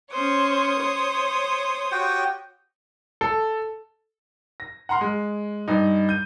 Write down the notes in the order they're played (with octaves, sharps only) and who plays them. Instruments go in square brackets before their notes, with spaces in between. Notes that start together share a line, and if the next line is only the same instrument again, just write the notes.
[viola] C#4 C5 [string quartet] C#5 D#6
[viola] C5
[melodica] F#4 G4 G5
[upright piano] A4
A#6
F#5 A#5 C6 F6
G#3
G2 D#4
G6 D#7